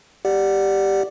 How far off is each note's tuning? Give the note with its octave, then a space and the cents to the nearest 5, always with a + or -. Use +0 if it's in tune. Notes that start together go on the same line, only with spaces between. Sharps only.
G4 +0 D5 +5 F#5 +0